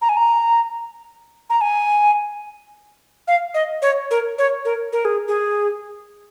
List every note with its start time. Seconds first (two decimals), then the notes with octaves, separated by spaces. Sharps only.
0.02 A#5
0.09 G#5
0.17 A#5
1.50 A#5
1.61 G#5
3.28 F5
3.54 D#5
3.82 C#5
4.11 A#4
4.38 C#5
4.65 A#4
4.93 A#4
5.05 G#4
5.28 G#4